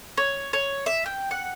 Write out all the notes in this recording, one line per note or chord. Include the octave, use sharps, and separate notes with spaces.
C#5
C#5
E5
G5
F#5